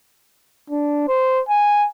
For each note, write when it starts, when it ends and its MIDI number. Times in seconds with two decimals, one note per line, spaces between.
0.70 1.05 62
1.08 1.41 72
1.49 1.87 80